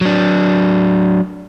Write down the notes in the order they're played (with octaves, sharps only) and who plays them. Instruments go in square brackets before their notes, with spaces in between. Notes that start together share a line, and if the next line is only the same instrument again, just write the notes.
[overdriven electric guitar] F#3 D4